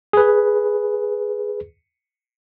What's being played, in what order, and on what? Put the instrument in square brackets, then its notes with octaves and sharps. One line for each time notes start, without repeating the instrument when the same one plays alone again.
[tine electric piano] G#4 B4